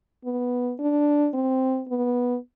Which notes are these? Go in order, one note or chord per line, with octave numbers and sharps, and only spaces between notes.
B3
D4
C4
B3